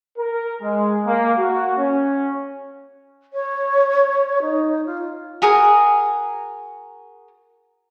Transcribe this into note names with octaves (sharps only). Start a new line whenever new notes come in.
A#4
G#3
A#3
F#4
C#4
C#5
D#4
F4
F#4 G#4 A#4 G#5